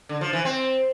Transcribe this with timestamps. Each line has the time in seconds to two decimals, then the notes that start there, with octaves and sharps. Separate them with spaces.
0.09 D3
0.21 F3
0.33 E3
0.45 C4